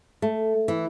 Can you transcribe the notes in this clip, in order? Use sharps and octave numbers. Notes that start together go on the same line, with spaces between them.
A3
E3